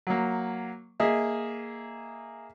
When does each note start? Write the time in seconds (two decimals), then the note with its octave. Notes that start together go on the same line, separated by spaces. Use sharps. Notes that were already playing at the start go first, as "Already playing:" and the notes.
0.07 F#3 A#3
1.00 A#3 G#4 D#5 E5